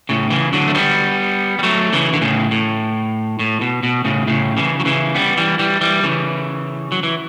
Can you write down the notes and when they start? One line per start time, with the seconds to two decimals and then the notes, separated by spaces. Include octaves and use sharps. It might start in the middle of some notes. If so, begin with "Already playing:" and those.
0.09 A2 C#3
0.30 C#3 E3
0.53 D3 F#3
0.68 A3
0.75 G3 B3
1.59 G3
1.63 F#3 A3
1.93 C#3 E3
2.13 D3
2.21 A2 C#3
2.51 A2
3.39 A2
3.61 B2
3.83 B2
4.05 A2 C#3
4.27 A2 C#3
4.57 C#3 E3
4.80 F#3
4.85 C#3 E3
5.15 G3 B3
5.37 E3 G3
5.59 E3 G3
5.81 E3 G3
6.03 C#3 E3
6.92 F#3
7.03 E3